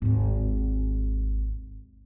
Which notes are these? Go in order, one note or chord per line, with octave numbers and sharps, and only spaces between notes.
G#1 D#2